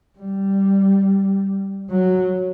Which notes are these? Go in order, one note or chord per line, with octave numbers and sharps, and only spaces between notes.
G3
F#3